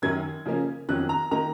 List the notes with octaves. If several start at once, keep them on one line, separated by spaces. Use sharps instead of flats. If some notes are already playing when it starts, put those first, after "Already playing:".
F#2 D#3 F#3 G#6
C#3 F3 A#3 C#4
F2 D#3 F#3 C#4 F#6
A#5
D#3 A#3 A#5